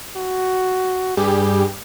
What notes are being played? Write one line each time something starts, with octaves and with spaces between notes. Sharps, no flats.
F#4
G2 G3 G4 G#4